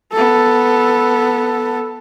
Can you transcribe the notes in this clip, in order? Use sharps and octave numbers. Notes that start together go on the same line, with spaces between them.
B3 A4